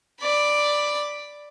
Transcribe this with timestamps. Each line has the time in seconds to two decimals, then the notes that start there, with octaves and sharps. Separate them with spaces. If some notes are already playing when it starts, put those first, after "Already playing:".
0.21 D5 B5